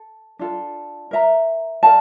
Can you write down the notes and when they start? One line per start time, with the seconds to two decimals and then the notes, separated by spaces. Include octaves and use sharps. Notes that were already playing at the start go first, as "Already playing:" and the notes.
Already playing: A4
0.39 D4 F4 A4
1.11 A#4 E5 A#5
1.83 A#4 D5 F5 A5